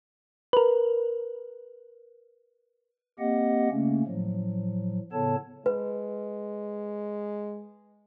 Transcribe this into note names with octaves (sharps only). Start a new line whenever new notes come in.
A#4 B4
A#3 C4 G4 D#5 F#5
C#3 A3 A#3 C#4
A2 F3 F#3
A2 C#3 B3 A4 C#5 A5
G#3 B4